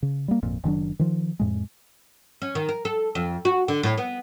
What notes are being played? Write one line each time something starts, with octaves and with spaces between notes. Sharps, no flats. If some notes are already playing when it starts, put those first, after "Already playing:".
C#3
G3 A#3
G#1 F2 A#2
F#1 D#3 F#3 D4
D#3 F3
F2 A2 G#3
C#4
D#3
A#4
A4
F2
F#4
D3
A2
B3